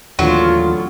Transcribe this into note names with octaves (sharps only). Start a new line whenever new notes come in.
D#2 A2 D3 E3 F#3 A#3 F4